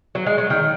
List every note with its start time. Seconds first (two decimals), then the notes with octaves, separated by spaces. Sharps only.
0.15 F#3
0.26 G#3
0.38 F#3
0.50 D#3